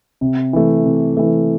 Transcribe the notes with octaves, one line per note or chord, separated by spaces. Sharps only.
C3
E3 A3
C3
E3 A3